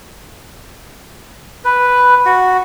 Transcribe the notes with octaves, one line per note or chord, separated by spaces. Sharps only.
B4
F#4